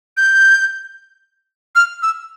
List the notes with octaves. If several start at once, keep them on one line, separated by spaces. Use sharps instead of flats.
G6
F6
E6